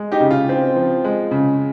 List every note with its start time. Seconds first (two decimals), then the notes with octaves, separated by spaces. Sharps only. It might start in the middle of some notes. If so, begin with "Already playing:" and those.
Already playing: G#3
0.12 D#4 G4
0.20 C#3
0.31 F4
0.49 C4
0.76 F3
1.04 G#3
1.31 C#3